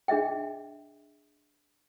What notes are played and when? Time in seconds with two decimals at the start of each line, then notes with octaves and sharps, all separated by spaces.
0.08 D4 G#4 D#5 E5 G5